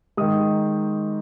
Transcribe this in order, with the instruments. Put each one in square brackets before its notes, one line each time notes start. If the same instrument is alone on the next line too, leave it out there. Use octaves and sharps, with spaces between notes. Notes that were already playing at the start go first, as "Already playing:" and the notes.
[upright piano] G#2 D#3 D#6